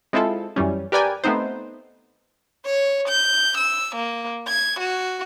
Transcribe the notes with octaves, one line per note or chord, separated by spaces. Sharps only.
G#3 C4 E4 F4 A4
F#2 E3 G3 C#4
G4 A#4 B4 D5 G5 G#5
A3 B3 C4 D#4 C5
C#5
G6
E6
A#3
G#6
F#4